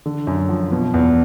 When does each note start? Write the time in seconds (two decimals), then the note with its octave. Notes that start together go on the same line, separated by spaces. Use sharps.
0.06 D3
0.27 F#2
0.49 F3
0.72 B2
0.94 E2